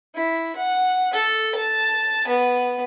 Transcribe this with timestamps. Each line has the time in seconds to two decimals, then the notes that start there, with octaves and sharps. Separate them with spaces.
0.15 E4
0.56 F#5
1.14 A4
1.56 A5
2.28 B3